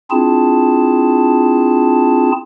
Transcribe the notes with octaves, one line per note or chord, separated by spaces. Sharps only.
C4 D4 E4 F4 G#4 A5